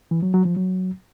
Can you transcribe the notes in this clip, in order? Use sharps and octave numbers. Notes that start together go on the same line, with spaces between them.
E3
F#3
F#3
F3
F#3